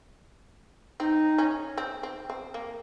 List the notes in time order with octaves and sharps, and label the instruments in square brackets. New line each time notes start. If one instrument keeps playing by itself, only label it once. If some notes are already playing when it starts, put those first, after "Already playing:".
[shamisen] C4 [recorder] D#4
[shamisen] C#4
C4
C4
C4
A#3